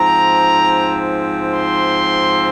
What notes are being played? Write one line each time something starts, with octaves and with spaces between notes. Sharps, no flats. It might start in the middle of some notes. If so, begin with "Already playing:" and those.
Already playing: G#2 F3 C4 A#5
C6